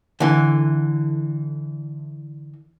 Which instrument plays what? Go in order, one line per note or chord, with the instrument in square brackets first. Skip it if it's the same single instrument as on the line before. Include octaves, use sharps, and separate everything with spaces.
[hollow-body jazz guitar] D3 E3